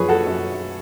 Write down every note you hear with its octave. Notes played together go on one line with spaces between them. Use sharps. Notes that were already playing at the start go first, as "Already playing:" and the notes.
Already playing: F#2 F3 G#4 B4 C#5
F#4 A4
F#2